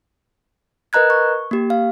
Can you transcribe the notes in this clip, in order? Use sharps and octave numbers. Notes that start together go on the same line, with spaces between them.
A#4 B4 D#5 A#5 F#6 G#6
C#6
A#3 G4
F5